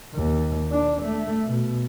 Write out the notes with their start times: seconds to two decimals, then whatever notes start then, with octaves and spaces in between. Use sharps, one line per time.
0.15 D#2
0.71 D4
1.02 A3
1.46 B2